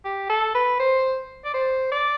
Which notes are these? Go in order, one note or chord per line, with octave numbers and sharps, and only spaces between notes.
G4
A4
B4
C5
D5
C5
D5